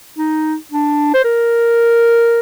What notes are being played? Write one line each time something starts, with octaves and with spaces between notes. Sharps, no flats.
D#4
D4
C5
A#4